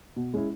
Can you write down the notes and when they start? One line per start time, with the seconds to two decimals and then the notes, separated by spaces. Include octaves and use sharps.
0.16 B2
0.34 G#3 C#4 E4